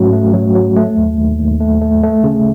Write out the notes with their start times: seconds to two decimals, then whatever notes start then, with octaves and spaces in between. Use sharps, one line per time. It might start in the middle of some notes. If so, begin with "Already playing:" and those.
Already playing: G#2 F#3 A3 C#4 F#4
0.13 A3
0.33 F#3
0.55 F#3
0.76 A3
0.97 D#2
1.18 D#2
1.39 D#2
1.60 A3
1.82 A3
2.03 A3
2.24 C#3